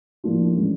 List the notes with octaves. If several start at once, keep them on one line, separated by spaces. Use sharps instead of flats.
A2 F3 A#3 D4 F4
A2 E3 G#3 C#4